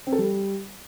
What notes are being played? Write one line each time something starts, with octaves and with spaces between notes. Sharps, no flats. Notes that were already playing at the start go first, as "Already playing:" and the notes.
C4
A4
G3